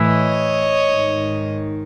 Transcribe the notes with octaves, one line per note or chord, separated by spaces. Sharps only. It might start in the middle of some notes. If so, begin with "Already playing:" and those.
Already playing: A2 E3
C#5 D#5
G#2 D#3